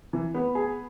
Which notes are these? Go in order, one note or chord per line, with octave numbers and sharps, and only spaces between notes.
E3
B3
G#4